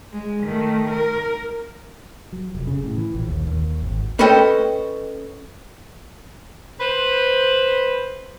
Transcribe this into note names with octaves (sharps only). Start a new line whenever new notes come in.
G#3
D#3 A3
A#4
F#3
F1
C#3
A2
E3
A#1
D#2
D#2
G#1
C#4 A4 B4 C5 D#5 G5
B4 C5